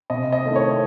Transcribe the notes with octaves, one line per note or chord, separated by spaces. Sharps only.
C3 D#5
D#5
D#3 A3 C4 E4
C#5